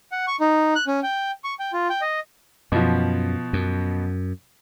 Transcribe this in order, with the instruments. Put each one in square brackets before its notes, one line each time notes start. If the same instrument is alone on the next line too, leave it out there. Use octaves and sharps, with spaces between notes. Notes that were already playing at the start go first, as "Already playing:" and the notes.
[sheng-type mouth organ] F#5
C#6
D#4
F#6
C#4
G5
C#6
G5
F4
G5
D#5
[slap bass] F#2 [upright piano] B2 F3
[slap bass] F#2